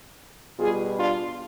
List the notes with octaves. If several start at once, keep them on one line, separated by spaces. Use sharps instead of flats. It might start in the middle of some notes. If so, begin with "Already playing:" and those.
B2 G3 F4 G#4
D4 F4